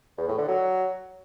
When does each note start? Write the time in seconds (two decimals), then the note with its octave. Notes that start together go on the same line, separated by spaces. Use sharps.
0.18 E2
0.28 A2
0.38 D3
0.48 F#3